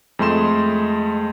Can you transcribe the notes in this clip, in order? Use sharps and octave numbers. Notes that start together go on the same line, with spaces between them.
F2 G#3 A3 C6 E7